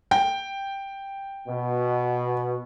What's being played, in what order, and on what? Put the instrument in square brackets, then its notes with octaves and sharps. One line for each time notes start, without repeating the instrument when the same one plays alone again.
[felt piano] G5
[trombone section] B2